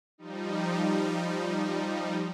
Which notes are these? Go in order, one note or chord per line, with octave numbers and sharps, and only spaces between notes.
F3 G3 D#4